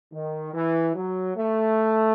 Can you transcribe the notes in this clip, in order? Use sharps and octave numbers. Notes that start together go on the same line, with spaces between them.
D#3
E3
F#3
A3